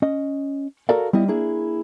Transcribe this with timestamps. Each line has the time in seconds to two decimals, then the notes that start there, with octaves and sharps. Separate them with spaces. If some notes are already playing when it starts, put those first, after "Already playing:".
0.02 C#4 D#5
0.89 F#4 A4 A#4 D5 F5
1.13 G3 B3 E4 D#5
1.28 A#3 D4 E4 G#4